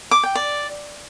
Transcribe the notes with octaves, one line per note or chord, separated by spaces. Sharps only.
D6
G5
D5